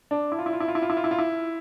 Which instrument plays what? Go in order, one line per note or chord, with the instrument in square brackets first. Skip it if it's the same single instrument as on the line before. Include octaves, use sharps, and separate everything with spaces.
[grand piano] D4
E4
F4
E4
F4
E4
F4
E4
F4
E4
F4
E4
F4
E4